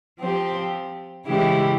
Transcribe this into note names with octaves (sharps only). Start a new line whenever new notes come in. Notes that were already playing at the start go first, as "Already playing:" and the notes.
F3 C4 G4
C#3 E3 G#3 E4 G4